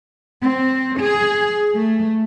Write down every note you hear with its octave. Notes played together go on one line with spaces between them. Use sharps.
C4
G#4
A3